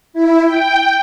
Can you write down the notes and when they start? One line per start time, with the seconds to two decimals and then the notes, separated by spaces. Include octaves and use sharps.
0.14 E4
0.46 G5